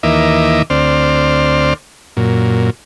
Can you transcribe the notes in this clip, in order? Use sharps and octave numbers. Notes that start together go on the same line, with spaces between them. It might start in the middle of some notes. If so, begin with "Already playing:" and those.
D#2 E3 A#3 D#5 E5 D6
D2 C4 C5 D5 F6
F#2 A#2